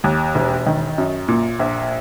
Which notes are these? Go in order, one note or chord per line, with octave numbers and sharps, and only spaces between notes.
D#2
E1
D#3
F#2
A#2
A#1